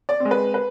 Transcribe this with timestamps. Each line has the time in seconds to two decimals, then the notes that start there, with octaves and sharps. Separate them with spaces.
0.09 D5
0.20 C4
0.25 G#3
0.31 B4
0.54 B4